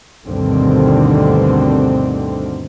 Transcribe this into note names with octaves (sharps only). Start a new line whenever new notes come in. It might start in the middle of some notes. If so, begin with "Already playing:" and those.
D2 G2 B2 D3 D#3 C4